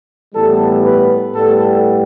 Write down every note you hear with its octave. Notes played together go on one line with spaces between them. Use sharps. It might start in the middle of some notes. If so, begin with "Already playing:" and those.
A2 E3 G3 B3 A4
B4
A2 G3 B3 A4